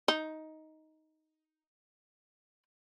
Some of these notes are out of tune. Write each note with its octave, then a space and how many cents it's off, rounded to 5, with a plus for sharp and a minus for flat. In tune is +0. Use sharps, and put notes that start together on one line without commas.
D#4 +10